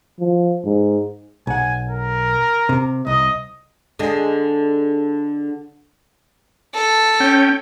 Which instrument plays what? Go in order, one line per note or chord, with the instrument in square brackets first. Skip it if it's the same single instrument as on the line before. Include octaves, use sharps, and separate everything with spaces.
[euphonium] F3
G#2
[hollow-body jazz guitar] B1 F#5 [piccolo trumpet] G#5
[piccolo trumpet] A#4
[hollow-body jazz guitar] C3
[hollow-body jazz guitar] C2 [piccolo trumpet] D#5
[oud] D3 G#3
[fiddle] A4
[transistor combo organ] C#4 G5